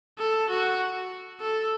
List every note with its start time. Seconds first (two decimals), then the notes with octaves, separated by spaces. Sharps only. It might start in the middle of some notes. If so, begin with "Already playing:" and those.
0.19 A4
0.50 F#4
1.41 A4